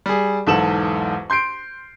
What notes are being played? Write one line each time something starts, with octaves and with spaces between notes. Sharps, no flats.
G3 G#4
B1 E2 G#2 A4 E7 F#7
C6 G6 C7 D7